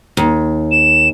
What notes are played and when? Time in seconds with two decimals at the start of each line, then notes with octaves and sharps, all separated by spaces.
0.17 D#2
0.71 E7